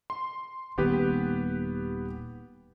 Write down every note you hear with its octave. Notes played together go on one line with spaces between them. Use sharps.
C6
D#1 D#2 B3 G4 B4